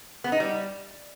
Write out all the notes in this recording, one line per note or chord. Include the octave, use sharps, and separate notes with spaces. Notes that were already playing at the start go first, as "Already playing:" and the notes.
B3
D#4
G3